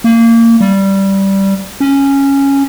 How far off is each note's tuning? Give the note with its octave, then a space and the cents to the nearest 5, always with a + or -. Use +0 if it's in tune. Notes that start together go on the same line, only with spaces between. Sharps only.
A#3 -25
G3 -10
C#4 -5